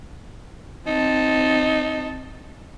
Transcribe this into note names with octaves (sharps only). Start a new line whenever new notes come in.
C4 D#4 A5